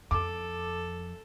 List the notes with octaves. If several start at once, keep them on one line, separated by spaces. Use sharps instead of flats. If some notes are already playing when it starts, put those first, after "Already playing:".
F2 A4 D6